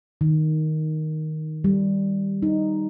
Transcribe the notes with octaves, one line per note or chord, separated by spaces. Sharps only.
D#3
G3
D#4